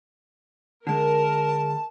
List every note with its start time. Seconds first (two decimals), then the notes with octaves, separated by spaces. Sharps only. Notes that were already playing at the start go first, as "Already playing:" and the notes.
0.87 D3 G#3 A#4 A5